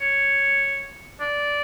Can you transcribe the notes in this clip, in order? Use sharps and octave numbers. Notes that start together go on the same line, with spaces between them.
C#5
D5